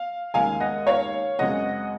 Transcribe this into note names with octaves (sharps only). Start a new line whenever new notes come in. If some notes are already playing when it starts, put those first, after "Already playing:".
Already playing: F5
D#2 C#3 G#3 F5 G#5
D#5 F#5
C#5 F5
F#2 C#3 G#3 C4 D#5 F#5